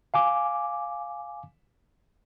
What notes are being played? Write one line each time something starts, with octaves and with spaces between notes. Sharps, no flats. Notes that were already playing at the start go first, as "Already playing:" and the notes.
F5 G#5 D6